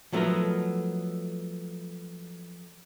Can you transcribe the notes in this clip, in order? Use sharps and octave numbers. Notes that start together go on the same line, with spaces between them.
F3 F#3 A3 B3 D#4 A#4